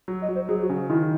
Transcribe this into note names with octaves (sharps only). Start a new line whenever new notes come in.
F#3
D#5
F#3
C5
F#3 G#4
F#4
C#3
D#3 E4